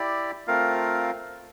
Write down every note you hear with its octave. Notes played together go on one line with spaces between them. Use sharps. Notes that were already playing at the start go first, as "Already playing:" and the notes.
Already playing: E4 G4 D5
A3 C4 F4 A#4 F5